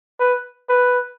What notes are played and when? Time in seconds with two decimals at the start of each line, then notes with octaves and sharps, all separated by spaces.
0.20 B4
0.69 B4